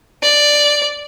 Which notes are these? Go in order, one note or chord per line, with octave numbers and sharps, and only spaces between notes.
D5